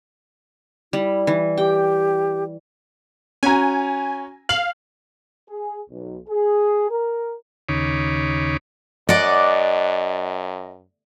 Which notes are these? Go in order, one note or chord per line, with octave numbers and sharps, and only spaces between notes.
G3 E4
E3
G4 G5
C#4 F#4 G#5 A#5
F5 F#7
G#4
B1
G#4
A#4
D#2 C#3 D#4 C#5 B5 D6
F#2 D5 D#5 F#5